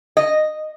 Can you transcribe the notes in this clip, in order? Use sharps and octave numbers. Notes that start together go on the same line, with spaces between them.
D#5